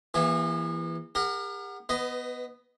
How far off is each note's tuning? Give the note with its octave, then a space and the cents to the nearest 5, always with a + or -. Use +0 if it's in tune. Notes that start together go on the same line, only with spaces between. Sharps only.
E3 +15 A#3 +35 G#4 -40
G4 +45 A#4 +0 F#5 +0
B3 +0 B4 +30 D#5 +0